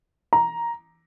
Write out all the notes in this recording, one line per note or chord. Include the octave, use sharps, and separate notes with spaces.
A#5